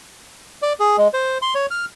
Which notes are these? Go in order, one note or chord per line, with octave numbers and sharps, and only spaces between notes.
D5
G#4
G#3
C5
C6
C#5
F6